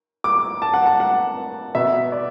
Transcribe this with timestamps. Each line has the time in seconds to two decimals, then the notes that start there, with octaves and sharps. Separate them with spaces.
0.24 D6
0.62 A5
0.74 F#5
0.86 A5
1.00 F#5
1.75 B2 B3 E5
2.12 D5